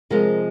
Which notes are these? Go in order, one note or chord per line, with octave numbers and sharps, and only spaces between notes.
C3 F3 G#3 A#4